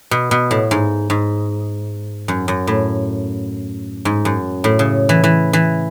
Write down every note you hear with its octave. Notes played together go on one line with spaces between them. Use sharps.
B2
B2
A2
G#2
G#2
F#2
F#2
A2
G#2
F#2
A2
C#3
E3
E3
E3